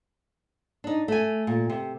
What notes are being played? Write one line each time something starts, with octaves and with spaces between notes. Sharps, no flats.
D4 D#4
A3 G#5
A#2
C3